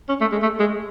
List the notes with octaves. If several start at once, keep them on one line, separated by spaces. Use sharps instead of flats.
C#4
A3
G#3
A3
G#3